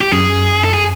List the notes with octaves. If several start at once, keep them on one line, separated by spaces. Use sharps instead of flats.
G4
F#2 G#4
A4
G#4